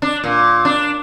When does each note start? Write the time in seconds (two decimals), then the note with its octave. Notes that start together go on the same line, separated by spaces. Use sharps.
0.02 D4
0.24 A#2
0.65 D4